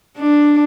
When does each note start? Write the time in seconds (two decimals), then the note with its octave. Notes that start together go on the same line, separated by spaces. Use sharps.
0.17 D4